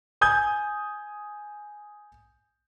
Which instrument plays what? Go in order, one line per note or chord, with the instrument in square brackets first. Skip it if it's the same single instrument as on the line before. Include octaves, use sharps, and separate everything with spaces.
[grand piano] G#5 D#6 G6 G#6